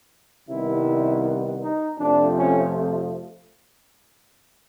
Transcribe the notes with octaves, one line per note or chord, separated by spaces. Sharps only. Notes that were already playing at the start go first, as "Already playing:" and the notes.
C2 C3 D#3 G3 B3 E4
D#4
F2 C3 F3 A3 C4 D4
C#4